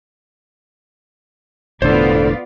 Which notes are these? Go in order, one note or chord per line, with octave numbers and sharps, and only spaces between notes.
E1 A2 D3 B3 F4 A4 C5 D5